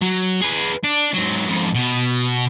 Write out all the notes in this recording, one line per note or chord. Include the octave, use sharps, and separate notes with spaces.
F#3
G#4 B4
D4
G#2 F#3
F2 G#2
B2 B3